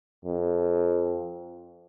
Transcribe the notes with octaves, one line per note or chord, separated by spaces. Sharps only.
F2